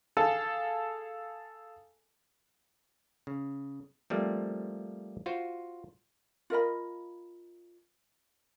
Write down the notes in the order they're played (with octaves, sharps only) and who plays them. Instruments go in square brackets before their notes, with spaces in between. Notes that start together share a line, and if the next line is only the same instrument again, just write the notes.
[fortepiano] G#4 A4 F5 A5
[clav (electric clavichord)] C#3
F3 G3 A3 A#3 C4
F4 F#4 C5
[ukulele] F4 A#4 D#5 B5